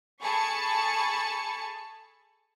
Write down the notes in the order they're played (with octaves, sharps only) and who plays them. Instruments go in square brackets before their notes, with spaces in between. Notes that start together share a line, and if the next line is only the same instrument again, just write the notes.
[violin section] G#4 A4 A5 B5 C#6 C#7